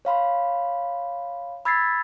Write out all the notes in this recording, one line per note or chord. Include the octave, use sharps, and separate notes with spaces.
C#5 F5 B5 C6
B5 E6 G#6 A6 B6 C7